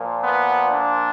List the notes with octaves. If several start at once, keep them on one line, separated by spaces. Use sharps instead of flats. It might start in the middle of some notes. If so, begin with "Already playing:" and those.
Already playing: A#2 F3
B3
D4